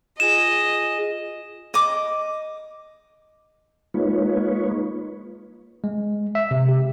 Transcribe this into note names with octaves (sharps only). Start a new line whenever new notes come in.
F4 G#4 D#5 G#5 E7
D#5 D6
G#3 A#3 D#4 F4 B4 C#5
G#3
E5
C3
G4